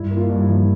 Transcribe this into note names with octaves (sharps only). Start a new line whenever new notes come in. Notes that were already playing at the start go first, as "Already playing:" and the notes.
Already playing: G2 E4
A#3
F4
G2
E4
F3